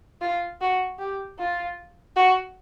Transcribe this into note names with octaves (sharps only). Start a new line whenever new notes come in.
F4
F#4
G4
F4
F#4